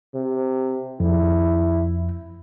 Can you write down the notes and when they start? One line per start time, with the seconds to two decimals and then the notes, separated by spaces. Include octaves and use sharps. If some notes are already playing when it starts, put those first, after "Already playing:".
0.14 C3
1.00 F2 E4